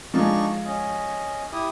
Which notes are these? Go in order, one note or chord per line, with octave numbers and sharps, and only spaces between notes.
F3 G#3 D4 D#4 C#6
C#4 D#5
E4 G4 D#6